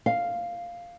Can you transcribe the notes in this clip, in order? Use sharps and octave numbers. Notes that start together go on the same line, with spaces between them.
F5